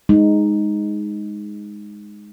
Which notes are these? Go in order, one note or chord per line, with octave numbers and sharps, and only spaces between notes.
G#3 D#4